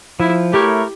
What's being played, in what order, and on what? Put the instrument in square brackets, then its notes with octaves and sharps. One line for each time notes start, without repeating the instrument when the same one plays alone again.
[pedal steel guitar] F3 [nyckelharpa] E4
[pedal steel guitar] A3 E4 A#4 C#5 [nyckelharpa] G4